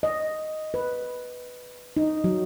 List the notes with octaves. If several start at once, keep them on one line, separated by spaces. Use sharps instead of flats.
D#5
B4
D#4
F#3